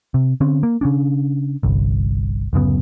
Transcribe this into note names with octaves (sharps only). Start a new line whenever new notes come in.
C3
D3 C4 C#4
A#3
C#3 C#4 D4
G1 C2
D1 F#2 C#3 B3